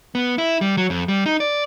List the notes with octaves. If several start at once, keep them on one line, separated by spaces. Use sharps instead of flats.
B3
E4
G3
F#3
F2
G3
D#4
D5